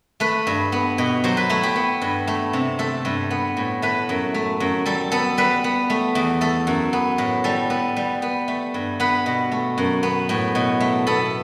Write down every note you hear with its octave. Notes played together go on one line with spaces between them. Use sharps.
A3 B4
G2
B3
B2
F#3 C5
B4
A3 E4
G4
B3
G2
A3
C3
A3 A4
G2
B3
A2
A3 B4
F#2
A3
F#2
G3 A4
B3 A4
G3 B4
B3
A3
E2
A3 A4
F#2
B3
A2
G3 A4
B3
G3
B3
A3
G2
B3 B4
B2
A3
F#2
B3
A2
B2
A3
B3 A4